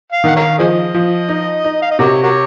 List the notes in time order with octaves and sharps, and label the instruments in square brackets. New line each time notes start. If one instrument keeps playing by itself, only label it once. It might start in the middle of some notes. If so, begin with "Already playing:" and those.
[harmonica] F5
[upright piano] D#3 [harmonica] F#5
[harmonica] A#4 C#5 F5
[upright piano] F3 [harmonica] G#4 C5 D#5
[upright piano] F3
D#4
D#4
[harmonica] F5
D#5
[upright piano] C3 [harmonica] F#4 A#4 C#5
[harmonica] F#4 A#4 C#5